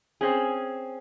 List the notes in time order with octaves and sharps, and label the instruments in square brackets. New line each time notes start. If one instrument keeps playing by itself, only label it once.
[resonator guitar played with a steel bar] C4 C#4 G#4